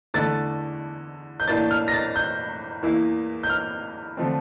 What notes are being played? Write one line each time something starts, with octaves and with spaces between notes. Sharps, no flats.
E2 D3 A3 E4 A6
G6
A2 E3 A#3 D4 A6
F6
A#6
A6
G6
E2 E3 A#3 E4
G6
F6
D3 F3 A3 C4